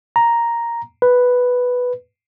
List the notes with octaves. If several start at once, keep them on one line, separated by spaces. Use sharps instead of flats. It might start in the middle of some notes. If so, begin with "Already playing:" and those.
A#5
B4